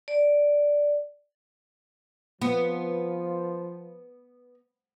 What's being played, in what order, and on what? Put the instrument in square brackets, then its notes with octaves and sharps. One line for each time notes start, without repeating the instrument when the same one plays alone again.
[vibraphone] D5
[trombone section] F3 [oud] B3